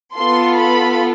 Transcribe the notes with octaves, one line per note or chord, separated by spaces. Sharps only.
B3 F4 A4 C6
B5